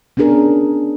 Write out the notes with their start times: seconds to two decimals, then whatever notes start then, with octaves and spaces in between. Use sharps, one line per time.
0.17 B3 C#4 D4 G#4 A#4